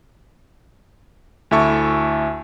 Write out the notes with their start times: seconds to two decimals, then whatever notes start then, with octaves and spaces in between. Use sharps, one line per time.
1.51 D2 E4 A4 E5 A5 C#6